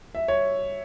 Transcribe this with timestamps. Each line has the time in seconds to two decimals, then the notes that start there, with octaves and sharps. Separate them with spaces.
0.15 E5
0.28 C#5